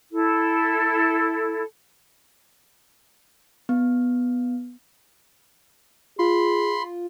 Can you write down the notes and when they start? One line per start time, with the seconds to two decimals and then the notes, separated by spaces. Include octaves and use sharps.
0.11 E4 A4
3.69 B3
6.19 F4 G#4 B5 C6